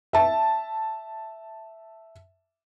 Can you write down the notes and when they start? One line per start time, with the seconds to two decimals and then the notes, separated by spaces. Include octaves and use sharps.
0.13 E5 A5